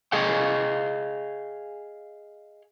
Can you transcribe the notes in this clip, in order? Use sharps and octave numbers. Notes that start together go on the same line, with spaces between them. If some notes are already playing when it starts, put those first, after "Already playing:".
G#4 D#5 F5 G5